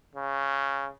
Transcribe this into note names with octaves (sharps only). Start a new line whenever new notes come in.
C#3